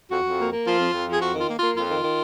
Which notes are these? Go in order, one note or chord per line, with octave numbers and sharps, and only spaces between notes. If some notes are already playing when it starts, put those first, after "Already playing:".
F2 F#4
F2
A#3
A#3
F3 F4
F2
F2
F3 G#4
F2 F#4
D#3
F4
A#3
F4
A#3
F2 F4
D#3
D#3